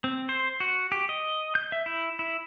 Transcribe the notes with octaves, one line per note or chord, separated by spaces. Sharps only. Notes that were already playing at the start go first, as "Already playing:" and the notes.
C4
C5
F#4
G4
D#5
G6
E5
E4
E4